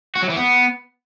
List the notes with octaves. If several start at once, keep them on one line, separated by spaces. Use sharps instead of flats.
F#4
F#3
E3
B3